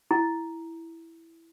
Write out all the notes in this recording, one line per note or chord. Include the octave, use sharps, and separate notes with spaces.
E4